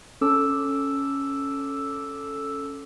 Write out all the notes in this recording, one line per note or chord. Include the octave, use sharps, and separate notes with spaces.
C#4 A4 D6 E6